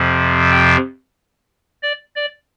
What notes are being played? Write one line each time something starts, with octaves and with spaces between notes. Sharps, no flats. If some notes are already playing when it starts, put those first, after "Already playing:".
Already playing: F2 C3 F3
G5
D5
D5